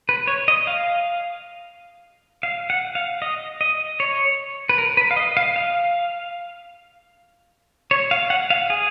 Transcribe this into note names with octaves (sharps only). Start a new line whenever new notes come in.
B4
C#5
D#5
F5
F5
F#5
F5
D#5
D#5
C#5
B4
A#4
B4
F5
D#5
F5
F5
C#5
F5
F#5
F5
G#4